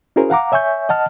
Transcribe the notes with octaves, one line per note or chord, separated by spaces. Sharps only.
C#4 E4 F#4 G#4 A#4 C5
F5 F#5 A#5 D6
C#5 E5 G#5 C#6 G6
D#5 F#5 A5 F6